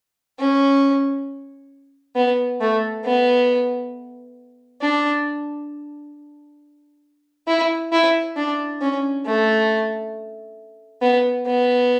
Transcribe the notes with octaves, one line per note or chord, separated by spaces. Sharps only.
C#4
B3
A3
B3
D4
E4
E4
D4
C#4
A3
B3
B3